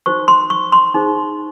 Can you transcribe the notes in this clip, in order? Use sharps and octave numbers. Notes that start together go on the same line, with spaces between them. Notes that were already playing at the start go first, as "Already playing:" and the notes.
D#4 F#4 C5 C#6
C6
C#6
C6
D#4 G#4 C5